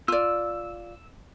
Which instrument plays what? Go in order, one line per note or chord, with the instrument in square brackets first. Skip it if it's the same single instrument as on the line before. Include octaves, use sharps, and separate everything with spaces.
[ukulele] F4 D5 [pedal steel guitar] E6